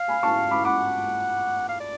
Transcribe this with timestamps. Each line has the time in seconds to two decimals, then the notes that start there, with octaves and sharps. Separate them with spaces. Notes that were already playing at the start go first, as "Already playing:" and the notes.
Already playing: F5
0.08 G#5 B5
0.23 A5 C#6
0.51 B5 D6
0.65 F#5 B5 D6
1.69 F5
1.80 D5